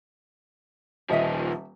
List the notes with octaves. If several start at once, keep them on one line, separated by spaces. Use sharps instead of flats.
D#1 F3 D#4 D#5 E5 A5